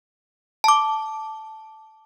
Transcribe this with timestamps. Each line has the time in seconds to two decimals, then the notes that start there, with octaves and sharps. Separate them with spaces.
0.64 A5 D6